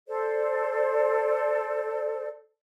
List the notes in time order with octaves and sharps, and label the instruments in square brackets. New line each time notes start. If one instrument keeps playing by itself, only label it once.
[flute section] A4 C5 D5